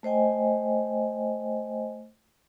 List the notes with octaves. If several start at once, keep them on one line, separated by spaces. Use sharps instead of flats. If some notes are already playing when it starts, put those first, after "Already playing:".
A3 C5 D#5 G5 G#5